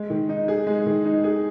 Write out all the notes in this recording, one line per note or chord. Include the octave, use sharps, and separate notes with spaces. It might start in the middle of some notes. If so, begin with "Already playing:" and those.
Already playing: G#3
D#3
D#4
G#4
G#3
D#3
D#4
G#4